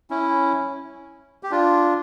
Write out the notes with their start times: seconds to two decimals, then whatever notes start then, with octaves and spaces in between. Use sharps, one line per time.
0.10 C#4 E4
1.43 G4
1.51 D4 F4